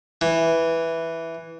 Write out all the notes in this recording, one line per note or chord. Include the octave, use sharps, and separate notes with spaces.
E3